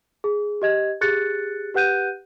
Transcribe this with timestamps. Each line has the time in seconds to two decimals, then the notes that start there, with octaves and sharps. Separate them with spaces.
0.24 G#4
0.62 G4 D#5 G#6
1.01 G4 G#4 F#6 A6 C#7
1.74 G4 B4 F#5 F#6 G6 D#7